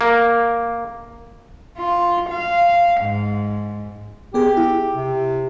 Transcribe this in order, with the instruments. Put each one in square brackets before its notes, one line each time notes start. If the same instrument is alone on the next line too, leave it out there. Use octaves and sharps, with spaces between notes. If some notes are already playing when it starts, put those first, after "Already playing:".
[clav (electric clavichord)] A#3
[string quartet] F4
F5
G#2
[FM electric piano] B3 G#4 [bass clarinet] G4
[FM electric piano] E4
[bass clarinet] C3